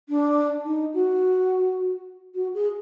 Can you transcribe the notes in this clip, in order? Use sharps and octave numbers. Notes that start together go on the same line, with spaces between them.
D4
D#4
F#4
F#4
G#4